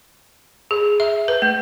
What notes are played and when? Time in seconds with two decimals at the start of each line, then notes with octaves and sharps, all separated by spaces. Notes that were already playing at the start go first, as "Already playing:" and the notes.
0.71 G#4
1.00 E5
1.28 B4
1.42 A3